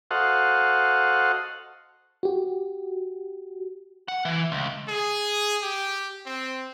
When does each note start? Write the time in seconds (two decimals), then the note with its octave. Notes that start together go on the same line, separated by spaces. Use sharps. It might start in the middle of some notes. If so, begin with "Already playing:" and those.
0.11 F#4 A4 C5 D#5 F5 F#5
2.23 F#4 G4
4.08 F#5
4.25 E3
4.52 C#2
4.89 G#4
5.63 G4
6.27 C4